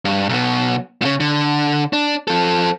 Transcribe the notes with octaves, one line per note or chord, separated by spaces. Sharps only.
G2
B1 B2
A#2 C#3
D3
D4
F3 A4